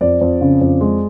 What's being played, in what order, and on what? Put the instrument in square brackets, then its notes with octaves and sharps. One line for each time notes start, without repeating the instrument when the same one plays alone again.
[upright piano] F2 D5
F2
C#3
F2
G#3